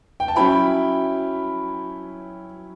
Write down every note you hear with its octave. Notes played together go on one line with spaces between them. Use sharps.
G5
A5
F#3 C#4 E4 G5 B5